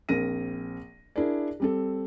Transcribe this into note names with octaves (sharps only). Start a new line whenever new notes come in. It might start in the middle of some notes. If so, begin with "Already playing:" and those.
A#1 C4 A#4 A#6 D#7
D4 E4 G#4 A#4 D5
G3 C4 A4